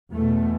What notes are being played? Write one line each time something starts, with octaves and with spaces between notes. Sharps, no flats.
E2 B2 A3